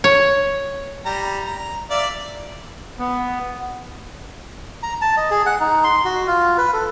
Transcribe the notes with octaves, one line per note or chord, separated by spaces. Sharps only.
C#5
G3 A#5
A#5
D5 E5 F5
B3
A#5
A5
D#5
G#4
F#5
D#4
C6
F#4
F4
B4
A4